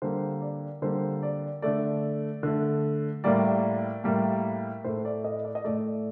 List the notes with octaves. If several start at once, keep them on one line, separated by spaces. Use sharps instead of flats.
D3 G3 A#3 C5
D5
D3 G3 A#3 C5
D5
D3 A3 D5
D3 A3
A2 G3 A#3 D5
A2 G3 A#3
A2 A3 C5
D5
D#5
D5
D#5
A2 A3 D5